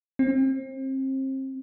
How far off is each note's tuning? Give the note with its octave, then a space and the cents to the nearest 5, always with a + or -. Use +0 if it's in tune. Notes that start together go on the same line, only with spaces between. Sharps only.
C4 +30